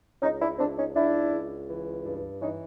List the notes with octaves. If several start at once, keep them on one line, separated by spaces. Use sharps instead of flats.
C#2 C#4 D#4
D4 E4
C#2 C4 D4
C#4 D#4
C#2 D4 E4
C#2
E3
G2
E3 C#4 D#4